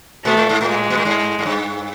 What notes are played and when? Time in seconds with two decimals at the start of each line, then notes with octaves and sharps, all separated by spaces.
0.24 A#2 A3
0.37 A2
0.49 G#2
0.61 A2 G#3
0.90 A#2
0.98 A2
1.05 G#2
1.39 G#2
1.46 G2